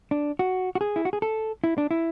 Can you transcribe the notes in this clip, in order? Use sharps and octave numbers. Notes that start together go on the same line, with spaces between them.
D4
F#4
F#4
G#4
E4
F#4
G#4
A4
E4
D4
E4